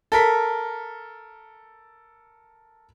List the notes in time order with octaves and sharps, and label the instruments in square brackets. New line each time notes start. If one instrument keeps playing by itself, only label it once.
[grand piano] A4 A#4 B6